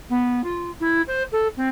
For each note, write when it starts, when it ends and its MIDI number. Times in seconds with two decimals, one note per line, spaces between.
0.09 0.41 59
0.43 0.70 65
0.80 1.01 64
1.07 1.23 72
1.32 1.47 69
1.56 1.68 60